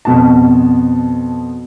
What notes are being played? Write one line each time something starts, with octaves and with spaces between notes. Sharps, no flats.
F2 B2 A5